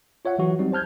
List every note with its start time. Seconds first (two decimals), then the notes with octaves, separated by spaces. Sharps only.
0.25 F4 C#5 E5 F#5
0.38 E3 F#3 F#4
0.59 F#3 G3 C4 D#4
0.72 C5 A5 F6 G6 G#6